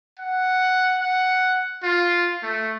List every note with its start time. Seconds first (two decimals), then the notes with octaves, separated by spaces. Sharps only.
0.20 F#5
0.99 F#5
1.83 F4
2.43 A3